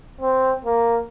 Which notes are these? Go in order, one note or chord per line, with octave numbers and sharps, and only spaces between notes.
C4
A#3